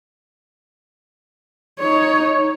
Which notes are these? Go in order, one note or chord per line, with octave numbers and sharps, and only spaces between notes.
D#4 C#5